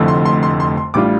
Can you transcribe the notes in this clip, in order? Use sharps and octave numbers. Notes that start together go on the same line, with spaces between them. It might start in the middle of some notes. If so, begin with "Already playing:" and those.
Already playing: F1 F2 D3 A3 E4
C6
C6
C6
C6
C6
A1 A2 G3 D4 F4 D6